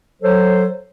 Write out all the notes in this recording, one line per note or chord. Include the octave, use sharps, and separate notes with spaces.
F#3 A4 C5 C#5